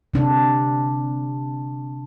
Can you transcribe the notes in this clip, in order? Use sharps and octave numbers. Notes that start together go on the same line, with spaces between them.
C3 D4